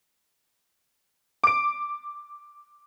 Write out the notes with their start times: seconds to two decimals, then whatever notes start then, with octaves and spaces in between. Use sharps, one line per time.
1.44 D6 D7